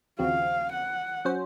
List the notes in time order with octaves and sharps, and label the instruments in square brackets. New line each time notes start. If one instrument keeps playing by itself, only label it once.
[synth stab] D#2 C#3 F3 C4 F#4 [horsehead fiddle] F5
[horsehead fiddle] F#5
[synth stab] F#3 C#4 F#4 C5